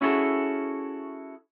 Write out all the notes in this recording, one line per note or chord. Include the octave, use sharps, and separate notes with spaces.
C#4 E4 F#4 G#4 A4